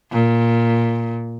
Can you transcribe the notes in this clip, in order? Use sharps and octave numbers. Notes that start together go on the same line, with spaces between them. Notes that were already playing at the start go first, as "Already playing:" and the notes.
A#2